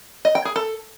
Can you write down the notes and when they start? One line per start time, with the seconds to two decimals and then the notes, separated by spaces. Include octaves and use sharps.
0.25 D#5
0.35 G5
0.45 G#4
0.56 A4